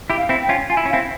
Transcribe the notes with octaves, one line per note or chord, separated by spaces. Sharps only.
E4 G4
F5
C4 E4
G5
C#4 F4
F4 G#5
E4
C#4
F5
C4 E4